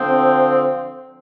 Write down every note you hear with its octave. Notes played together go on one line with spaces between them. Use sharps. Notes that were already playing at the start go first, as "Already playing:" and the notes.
Already playing: D3 F3 C4